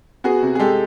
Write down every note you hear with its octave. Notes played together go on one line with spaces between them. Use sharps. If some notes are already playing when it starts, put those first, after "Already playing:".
B3 F#4 G#4
C3
G#4
G#3 G4 A4